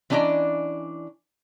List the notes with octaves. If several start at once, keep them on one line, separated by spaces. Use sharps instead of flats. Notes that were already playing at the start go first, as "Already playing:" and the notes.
E3 C#4 D4 D5 D#5 A#5